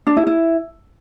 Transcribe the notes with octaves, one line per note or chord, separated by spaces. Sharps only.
D4
E4
E4